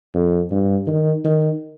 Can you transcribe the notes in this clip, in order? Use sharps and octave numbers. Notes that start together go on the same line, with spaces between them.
F2
G2
D#3
D#3